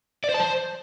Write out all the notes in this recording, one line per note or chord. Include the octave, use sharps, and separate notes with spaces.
D5
C5
A5
C5